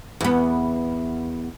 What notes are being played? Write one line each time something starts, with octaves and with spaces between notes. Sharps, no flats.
E2 B3